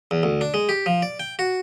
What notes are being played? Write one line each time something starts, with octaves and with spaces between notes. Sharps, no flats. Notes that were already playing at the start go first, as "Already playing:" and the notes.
E2
D2
D4
G#3
G4
F3
D5
G5
F#4